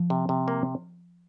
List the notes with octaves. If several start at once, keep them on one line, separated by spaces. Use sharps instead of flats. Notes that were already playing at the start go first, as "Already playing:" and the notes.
Already playing: F3
C3
C3
A#3